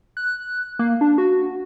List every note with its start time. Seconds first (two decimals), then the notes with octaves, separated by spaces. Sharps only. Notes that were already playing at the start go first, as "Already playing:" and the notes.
0.17 F#6
0.79 A#3
1.01 D4
1.18 F#4